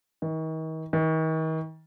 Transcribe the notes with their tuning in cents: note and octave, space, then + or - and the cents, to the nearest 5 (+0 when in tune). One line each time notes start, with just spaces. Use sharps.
D#3 +40
D#3 +40